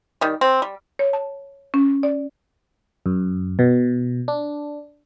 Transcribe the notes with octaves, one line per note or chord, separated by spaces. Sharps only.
D#3 G3
C4
G3
C#5
A5
C#4
D5
F#2
B2
D4